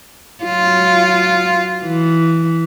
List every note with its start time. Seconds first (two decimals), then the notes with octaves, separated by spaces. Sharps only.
0.44 F#3 F4
1.83 E3